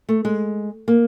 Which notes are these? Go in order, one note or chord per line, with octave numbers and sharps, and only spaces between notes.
A3
G#3
A#3